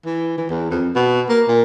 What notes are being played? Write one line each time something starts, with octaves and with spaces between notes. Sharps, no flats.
E3
E3
E2
F2
B2
A#3
A#2